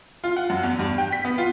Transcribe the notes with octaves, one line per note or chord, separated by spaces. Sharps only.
F4
F#5
F#2
E2
G2
G5
B6
B3
F4